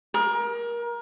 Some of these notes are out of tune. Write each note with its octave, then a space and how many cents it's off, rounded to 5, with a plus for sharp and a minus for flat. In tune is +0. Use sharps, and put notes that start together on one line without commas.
A#4 +25